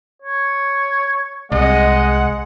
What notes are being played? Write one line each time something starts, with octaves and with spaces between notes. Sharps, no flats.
C#5
C2 G#3 D#5 F#5